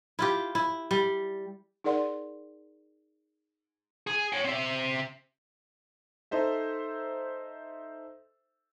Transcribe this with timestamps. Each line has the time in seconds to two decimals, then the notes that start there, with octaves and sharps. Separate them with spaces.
0.19 E4 F4 G4
0.55 E4
0.91 G3
1.84 D#4 G#4 A#4 D5 F#5 C6
4.07 G#4
4.33 C#5 G5
4.45 C4 E5
6.31 D#4 A4 C5 E5